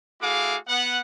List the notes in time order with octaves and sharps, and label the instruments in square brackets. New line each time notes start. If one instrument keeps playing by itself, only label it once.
[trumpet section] A3 E4 F#4 G#4 F5 D6
B3 F#5